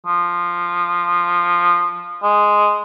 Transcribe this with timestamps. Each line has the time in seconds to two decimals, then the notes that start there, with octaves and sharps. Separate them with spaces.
0.06 F3
2.22 G#3